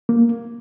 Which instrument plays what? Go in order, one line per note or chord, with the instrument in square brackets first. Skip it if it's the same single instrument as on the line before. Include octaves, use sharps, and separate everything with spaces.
[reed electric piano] A#3